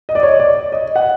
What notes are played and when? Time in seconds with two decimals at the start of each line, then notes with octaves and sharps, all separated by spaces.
0.09 D#5
0.15 D5
0.23 C#5
0.40 D5
0.72 D#5
0.96 F#5